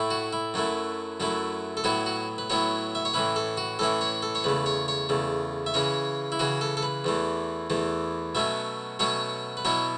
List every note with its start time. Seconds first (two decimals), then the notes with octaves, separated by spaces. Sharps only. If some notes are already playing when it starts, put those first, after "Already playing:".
Already playing: A2 A3 E4
0.10 F#4
0.33 E4
0.54 F#2 F#3 A3 E4
1.20 F#2 F#3 A3 E4
1.77 A4
1.84 A2 F#3 B3 E4 F#4
2.06 F#4
2.38 B4
2.50 A2 F#3 B3 E4 C#5
2.95 E5
3.05 C#5
3.14 A2 E3 C#4 E4 B4
3.36 A4
3.57 F#4
3.79 A2 E3 C#4 E4 A4
4.01 C#5
4.23 A4
4.35 C#5
4.44 E2 C#3 A3 B4
4.66 C#5
4.88 C#5
5.09 E2 C#3 A3
5.66 E5
5.74 C#3 E3 C#4 C#5
6.32 E4
6.39 C#3 E3 C#4 F#4
6.61 A4
6.77 A4
6.83 B4
7.04 E2 E3 A3
7.70 E2 E3 A3
8.35 B2 F#3 A3 C#4 E5
8.99 B2 F#3 A3 C#4 C#5
9.57 B4
9.65 B2 F#3 B3 E4 C#5